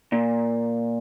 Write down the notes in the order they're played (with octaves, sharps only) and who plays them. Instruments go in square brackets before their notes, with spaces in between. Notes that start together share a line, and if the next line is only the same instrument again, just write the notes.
[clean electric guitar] A#2